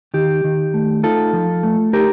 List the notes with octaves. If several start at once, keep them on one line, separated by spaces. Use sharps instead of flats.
D#3 G4
D#3
A3
D#4 F4 A4
F3
A3
D#4 G4 A#4